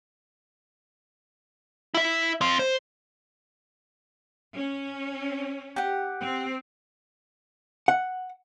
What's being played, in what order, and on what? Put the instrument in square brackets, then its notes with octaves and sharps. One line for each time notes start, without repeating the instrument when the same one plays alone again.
[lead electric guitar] E4 E5
C4 F5
C5
[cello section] C#4
[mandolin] G4 F#5
[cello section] C4
[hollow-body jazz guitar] F#5